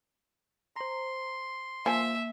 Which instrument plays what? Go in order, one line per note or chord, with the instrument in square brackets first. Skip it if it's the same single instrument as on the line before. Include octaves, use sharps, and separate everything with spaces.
[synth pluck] C5 A#5 [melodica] C6
[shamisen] F3 G#5 [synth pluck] A#3 [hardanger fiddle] E5